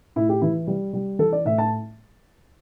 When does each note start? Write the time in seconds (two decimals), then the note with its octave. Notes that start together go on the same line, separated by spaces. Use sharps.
0.16 A2 E4
0.29 G4
0.42 E3 E4
0.67 G3
0.93 G3
1.19 E3 A4
1.32 D5
1.45 A2 E5
1.58 A5